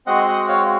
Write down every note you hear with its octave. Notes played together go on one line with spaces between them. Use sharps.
G#3 C4 F#4 D#5 F#5
D#5 F#5
C#5 F5